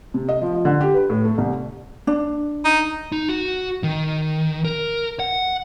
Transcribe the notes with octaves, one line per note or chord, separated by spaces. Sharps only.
C3
D#5
F3
F3
D3
G4
B4
A2
A3
C2
D4
D#4
D#4
F#4
D#3
A#4
F#5